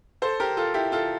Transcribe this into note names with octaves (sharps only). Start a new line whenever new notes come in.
A4 C5
G4 A#4
F4 A4
E4 G4
F4 A4